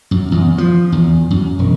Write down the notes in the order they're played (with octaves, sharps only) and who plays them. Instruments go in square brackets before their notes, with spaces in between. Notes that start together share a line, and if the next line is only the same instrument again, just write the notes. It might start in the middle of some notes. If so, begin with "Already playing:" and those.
[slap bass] F#2
E2
F3
E2
F#2
E1